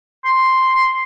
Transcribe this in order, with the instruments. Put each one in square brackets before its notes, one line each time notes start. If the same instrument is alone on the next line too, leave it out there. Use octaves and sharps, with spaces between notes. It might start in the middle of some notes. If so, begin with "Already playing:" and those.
[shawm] C6